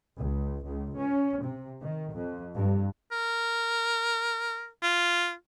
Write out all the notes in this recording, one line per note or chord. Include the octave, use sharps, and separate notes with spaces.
C#2
C#2
C#4
C3
D#3
F2
G2
A#4
F4